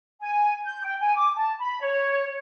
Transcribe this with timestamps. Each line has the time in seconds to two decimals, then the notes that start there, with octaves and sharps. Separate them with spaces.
0.21 G#5
0.65 G6
0.84 G5
1.01 G#5
1.17 D6
1.37 A5
1.59 B5
1.81 C#5